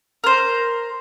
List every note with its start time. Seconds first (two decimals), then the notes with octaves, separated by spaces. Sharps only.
0.24 A#4 C5